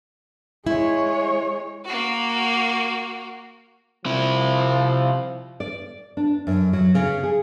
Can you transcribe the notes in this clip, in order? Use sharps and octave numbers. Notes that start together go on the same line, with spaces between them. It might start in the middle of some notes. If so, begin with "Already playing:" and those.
G#3 E4 C#5
A#3 F#4
C3 F3 E4
D5
D4
F#2
F#3
C#3
G#4